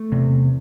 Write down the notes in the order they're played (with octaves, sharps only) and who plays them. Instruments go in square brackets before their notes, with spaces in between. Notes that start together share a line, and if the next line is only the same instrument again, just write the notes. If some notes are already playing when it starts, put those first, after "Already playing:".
Already playing: [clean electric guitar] A3
[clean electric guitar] E2 [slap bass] C3